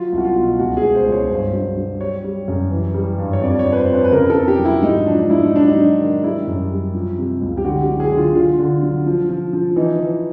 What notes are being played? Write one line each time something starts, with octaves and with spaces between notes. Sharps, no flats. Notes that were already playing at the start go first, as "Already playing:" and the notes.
Already playing: F#3 F4
C2
F#4
F4
B2
C#2 F#4
G#4
C#2
C5
C#2
C#5
G2 C5
F#3
F#3
G3 C#5
G3
F#2
E3
G3
G2
C#5
F2 D5
C#5
F2
B4
C5
F2
B4
B4
C#3 A#4
A4
F2
G4
F#3
E4
G#2 D#4
F3 D4
G#2 E4
D#4
F#3 D4
D#4
F#3
D#3
G3 E4
F#2
G3
F3
C3
C#2
G4
D3 F#4
G4
F#3
G#4
D3
F4
D3 F4
D3
F#3
F3
F3
F3
E3 D#4
E3